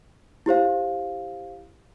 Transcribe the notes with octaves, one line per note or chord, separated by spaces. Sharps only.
E4 G4 C5 F5